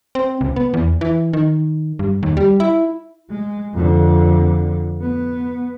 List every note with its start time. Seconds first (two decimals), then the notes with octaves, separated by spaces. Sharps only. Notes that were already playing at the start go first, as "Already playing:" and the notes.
0.15 C4
0.41 C#2
0.56 B3
0.74 E2
1.01 E3
1.33 D#3
1.99 G2
2.23 D#2
2.37 G3
2.60 E4
3.30 G#3
3.73 F2 D3
5.01 B3